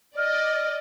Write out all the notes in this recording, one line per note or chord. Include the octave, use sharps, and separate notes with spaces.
D5 D#5 F6